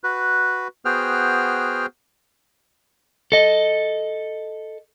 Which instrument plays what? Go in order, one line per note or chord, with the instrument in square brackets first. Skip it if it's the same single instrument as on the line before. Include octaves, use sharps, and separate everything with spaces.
[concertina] F#4 B4
B3 F#4 G#4 C5 G5 F6
[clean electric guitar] A4 D#5